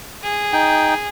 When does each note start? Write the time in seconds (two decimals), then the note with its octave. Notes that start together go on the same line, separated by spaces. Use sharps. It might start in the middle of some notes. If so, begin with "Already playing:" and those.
0.23 G#4
0.53 D#4 G5